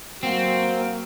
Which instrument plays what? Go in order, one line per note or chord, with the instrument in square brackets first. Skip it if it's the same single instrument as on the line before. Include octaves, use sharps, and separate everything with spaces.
[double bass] F#3 [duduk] A#3 [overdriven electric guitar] C4 [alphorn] F#4